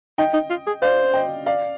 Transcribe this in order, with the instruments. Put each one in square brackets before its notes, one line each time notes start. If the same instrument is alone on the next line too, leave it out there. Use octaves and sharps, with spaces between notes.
[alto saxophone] D#4 [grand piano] D#5 G5
[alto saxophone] D#4
F4
G#4
[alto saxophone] C5 [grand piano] D5 F5
[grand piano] D#5 G5
D5 F5